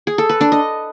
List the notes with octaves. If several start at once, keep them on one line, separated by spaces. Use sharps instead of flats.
G#4
A4
B4
D4
D#5